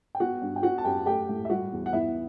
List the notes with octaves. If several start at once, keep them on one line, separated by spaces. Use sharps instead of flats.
G5
B3 F#4 F#5
G2
G5
B3 F#4 F#5
A5
F#2 G4 G5
A3 G4 G5
A2
E5
G3 F#4 F#5
E2
F#5
B3 E4 E5